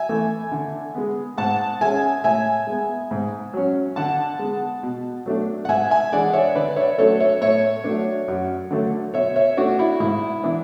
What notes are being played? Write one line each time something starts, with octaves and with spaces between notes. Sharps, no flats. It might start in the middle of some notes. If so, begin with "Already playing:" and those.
Already playing: E5 G#5
E3 A3
D3
G#3 B3
G#2 F#5 A5
G#3 C#4 E5 G#5
A2 E5 G#5
G#3 B3
G#2
F#3 C#4
D3 F#5 A5
G#3 B3
B2
F#3 A3 D4
F#5
G#2 E5 G#5
E5 G#5
E3 G#3 D4 D5 F#5
C#5 E5
D3 B4 D5
C#5 E5
F#3 A3 D4 A4 C#5
C#5 E5
A2 C#5 E5
F#3 A3 D4
F#2
D3 F#3 A3
B2 C#5 E5
C#5 E5
A3 D4 F#4
E4
G#2 E4
E3 B3 D4